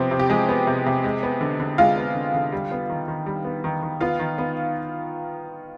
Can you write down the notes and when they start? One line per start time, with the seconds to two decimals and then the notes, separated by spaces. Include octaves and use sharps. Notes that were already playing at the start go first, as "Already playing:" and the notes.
Already playing: C3 F3 B3 C4 C5
0.11 C3
0.19 G4
0.30 F3 G#3 G#4
0.49 B3
0.67 C3
0.86 C3
1.04 G#3
1.23 B3
1.41 D3
1.60 D3
1.78 G#3 F4 F5
1.97 B3
2.15 D3
2.34 D3
2.52 G3
2.72 B3
2.89 D#3
3.08 D#3
3.26 G3
3.45 B3
3.64 D#3
3.82 D#3
4.00 B3 F4 F5
4.19 D#3
4.38 B3